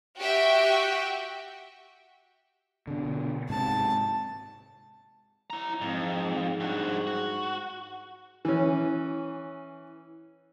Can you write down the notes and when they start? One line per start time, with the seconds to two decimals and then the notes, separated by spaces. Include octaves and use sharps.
0.19 F#4 G4 E5 G5
2.87 B2 D3
3.49 G#2 C3 A5
5.50 E4 A#5
5.81 F2 G#2
6.60 G2 F#4
7.07 F#4
8.45 E3 C#4